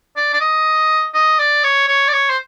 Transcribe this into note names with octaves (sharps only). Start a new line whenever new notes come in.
D5
D5
D#5
D#5
D5
C#5
C#5
D5
C#5
C5